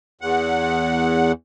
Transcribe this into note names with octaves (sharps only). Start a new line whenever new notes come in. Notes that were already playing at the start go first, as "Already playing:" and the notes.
E2 F#5